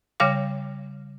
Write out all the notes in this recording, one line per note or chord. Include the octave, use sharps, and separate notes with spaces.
C#3 G3 C#5 F5 D6